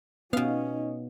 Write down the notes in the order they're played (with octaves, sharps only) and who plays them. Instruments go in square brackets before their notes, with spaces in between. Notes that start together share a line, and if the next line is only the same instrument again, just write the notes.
[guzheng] B2 F5 [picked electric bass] B3 [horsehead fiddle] C#4 [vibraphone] D#4 C#5 D#5